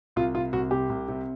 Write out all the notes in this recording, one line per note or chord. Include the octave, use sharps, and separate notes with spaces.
C2 F4
C3 F4
C2 F#4
C3 G4
C2
C3